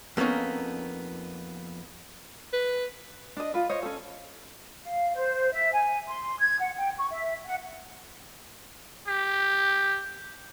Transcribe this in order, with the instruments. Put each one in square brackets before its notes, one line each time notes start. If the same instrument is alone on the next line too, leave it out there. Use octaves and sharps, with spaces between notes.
[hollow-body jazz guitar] F2 A#3 B3 C#4 D#4
[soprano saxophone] B4
[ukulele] D4 D#5
F4 B4
C5 C#5 D#5
C#4 A4
[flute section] F5
C5
E5
G#5
C6
G#6
F#5
G5
C#6
E5
F#5
[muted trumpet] G4